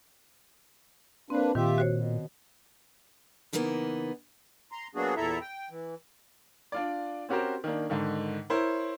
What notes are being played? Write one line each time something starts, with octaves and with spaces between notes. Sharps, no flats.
A#3 C4 D4 B4 C5
A#2 D#3 F4 G4 E5
F#4 C5 C#5
B2
C#3 E3 G3 A#3 B3 D#4
A#5 C6
F#3 A#3 B3 D4 F#4 G#4
E2 A#2 E4 A4 E5 A#5
G5
E3
D4 F4 D5
C4 C#4 F#4 G4 A#4 C5
D#3 A#3 D4
G#2 D3 D#3
E4 A#4 C5 C#5